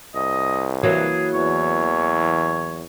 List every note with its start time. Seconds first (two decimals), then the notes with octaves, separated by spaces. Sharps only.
0.15 C2 D#5
0.83 E3 F#3 A#3 G#4
1.34 E2 C#5